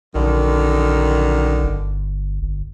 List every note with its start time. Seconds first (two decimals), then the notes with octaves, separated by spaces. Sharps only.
0.15 A#1 F#2 D3 D#3
1.63 G1
2.42 G1